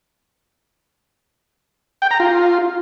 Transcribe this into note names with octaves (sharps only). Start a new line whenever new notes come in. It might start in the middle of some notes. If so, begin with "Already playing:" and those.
G5
A#5
F4